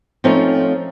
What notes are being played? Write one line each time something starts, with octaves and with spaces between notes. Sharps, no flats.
F3 A3 C4 C#4 D#4 F4